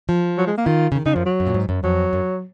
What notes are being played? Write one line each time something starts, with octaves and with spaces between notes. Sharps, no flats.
F3
F#3
G#3
A#3
D#3 F4
C#3
D#3
C#3 D#4
F#2 F3
F#3
F#2
A#2
G#2
F#2
F2 F#3
F#2